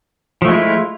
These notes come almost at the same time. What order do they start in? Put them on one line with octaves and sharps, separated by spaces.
F3 A3 G#3 E4 F4